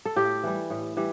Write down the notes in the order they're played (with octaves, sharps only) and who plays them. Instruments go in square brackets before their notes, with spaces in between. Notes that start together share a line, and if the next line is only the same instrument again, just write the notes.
[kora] A4
A2 G4
E3 G3
A2
E3 G3